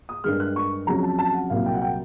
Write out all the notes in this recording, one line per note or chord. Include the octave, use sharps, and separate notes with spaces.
D#6
G2 D#3 G#3 F6
F#6
C#6
F2 C#3 F#3 A#5
A5
A5
F#5
C2 A#2 F#3 F5
G5
F#5
G5